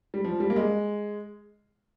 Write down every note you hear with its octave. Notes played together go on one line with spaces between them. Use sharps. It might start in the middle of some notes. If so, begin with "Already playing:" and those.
G3
F3
G3
A#3
G#3